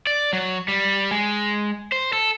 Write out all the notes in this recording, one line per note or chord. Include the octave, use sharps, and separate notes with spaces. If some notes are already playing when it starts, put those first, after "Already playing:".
D5
F#3
G3
G#3
C5
A4